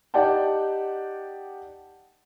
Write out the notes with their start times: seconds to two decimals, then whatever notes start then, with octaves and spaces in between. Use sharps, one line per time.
0.14 D#4 G4 D5 F#5 G5 A5